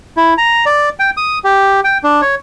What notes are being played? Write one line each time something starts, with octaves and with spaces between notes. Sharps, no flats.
E4
A#5
D5
G5
D#6
G4
G5
D4
C#5